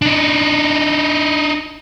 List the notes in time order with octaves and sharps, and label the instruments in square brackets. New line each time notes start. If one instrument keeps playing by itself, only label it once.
[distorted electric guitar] D4 D#4